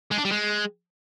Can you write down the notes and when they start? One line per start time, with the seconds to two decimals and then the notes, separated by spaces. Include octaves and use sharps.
0.12 G#3
0.18 D4
0.25 G3
0.32 G#3